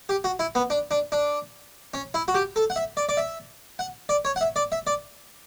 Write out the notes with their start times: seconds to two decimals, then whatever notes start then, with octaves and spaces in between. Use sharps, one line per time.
0.09 G4
0.24 F#4
0.39 E4
0.55 B3
0.70 D4
0.91 D4
1.12 D4
1.94 C#4
2.14 E4
2.28 F#4
2.34 G4
2.56 A4
2.70 F#5
2.76 E5
2.97 D5
3.09 D5
3.17 E5
3.79 F#5
4.09 D5
4.25 C#5
4.36 F#5
4.41 E5
4.56 D5
4.72 E5
4.87 D5